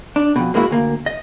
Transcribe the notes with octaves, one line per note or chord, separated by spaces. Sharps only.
D4
F2 B2
G#3 A#3 D#4 E4 F#4
D2 A#3
D#5